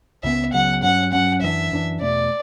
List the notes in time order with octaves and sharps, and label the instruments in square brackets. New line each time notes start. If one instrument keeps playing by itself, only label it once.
[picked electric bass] C#2 C#3 F#3 B3 [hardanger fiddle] E5
[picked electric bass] C#2 C#3 F#3 B3 [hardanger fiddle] F#5
[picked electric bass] G2 F#3 C#4 [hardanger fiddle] F#5
[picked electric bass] G2 F#3 C#4 [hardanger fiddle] F#5
[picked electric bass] F#2 E3 B3 D4 [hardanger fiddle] E5
[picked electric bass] F#2 E3 B3 D4
[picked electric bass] E2 B2 A3 [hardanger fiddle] D5